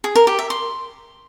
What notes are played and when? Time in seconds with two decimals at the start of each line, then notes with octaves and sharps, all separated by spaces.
0.04 G#4
0.16 A#4
0.27 G4
0.39 E5
0.50 C6